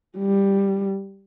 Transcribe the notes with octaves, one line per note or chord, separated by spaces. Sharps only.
G3